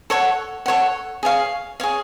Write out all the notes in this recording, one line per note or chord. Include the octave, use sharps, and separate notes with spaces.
A4 C#5 F#5
A4 C#5 F#5
G#4 C#5 F5
G#4 C#5 F5